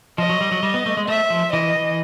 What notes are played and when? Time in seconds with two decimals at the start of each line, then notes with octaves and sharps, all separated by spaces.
0.18 F3 D#5
0.29 F#3
0.41 G3
0.52 F#3
0.63 G3
0.74 B3
0.86 A3
0.97 G#3
1.08 A3 E5
1.30 F3
1.52 E3 D#5
1.76 E3